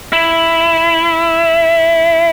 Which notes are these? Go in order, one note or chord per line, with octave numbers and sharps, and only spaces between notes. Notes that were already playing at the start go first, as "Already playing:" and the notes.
E4